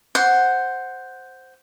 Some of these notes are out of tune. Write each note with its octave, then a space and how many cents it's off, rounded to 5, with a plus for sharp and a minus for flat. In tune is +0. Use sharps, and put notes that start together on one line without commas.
C5 +0 F#5 +0